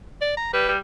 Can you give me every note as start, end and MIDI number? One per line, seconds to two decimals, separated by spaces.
0.21 0.33 74
0.37 0.52 82
0.54 0.67 55
0.54 0.71 71
0.68 0.78 55